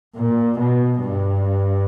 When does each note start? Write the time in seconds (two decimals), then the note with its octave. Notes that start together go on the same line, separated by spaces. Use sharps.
0.16 A#2
0.58 B2
1.01 G2